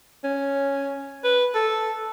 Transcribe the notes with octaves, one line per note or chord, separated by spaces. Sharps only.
C#4
B4
A4